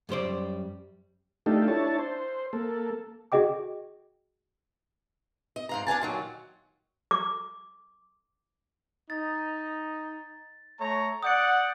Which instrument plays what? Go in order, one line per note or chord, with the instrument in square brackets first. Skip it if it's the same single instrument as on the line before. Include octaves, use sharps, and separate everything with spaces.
[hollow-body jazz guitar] F#2 G3 C5 D5
[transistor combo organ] A3 D4 D#4 F4 G4 A4
D4 E4 C#5 A5
C5
A#3 A4
[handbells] F#4 G#4 D#5 G5 D6
[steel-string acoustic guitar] D#5
G#2 F5 A#5
D4 F5 G#5 A5
A#2 D#3 F#3
[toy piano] D6
[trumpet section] D#4 [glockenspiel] A6
[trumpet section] A3 C#5 A#5
[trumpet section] D5 F#5 [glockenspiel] D#6 G6 C#7